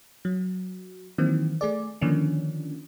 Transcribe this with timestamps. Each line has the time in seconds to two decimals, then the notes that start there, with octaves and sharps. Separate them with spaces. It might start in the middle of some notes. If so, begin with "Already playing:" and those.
0.25 F#3
1.18 D#3 E3 F#3 A#3 C4
1.61 A3 G#4 D5
2.01 D3 D#3 F3 A#3 C#4 D4